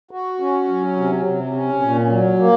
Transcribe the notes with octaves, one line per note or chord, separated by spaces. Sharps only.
F#4
C#4
F#3
C3
C3
C#4
A#2
F#3
A#3